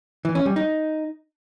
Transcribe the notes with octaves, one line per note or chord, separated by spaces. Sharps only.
E3
C#4
G3
D#4